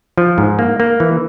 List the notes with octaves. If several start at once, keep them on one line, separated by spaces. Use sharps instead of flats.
F3
G#2
A#3
A#3
E3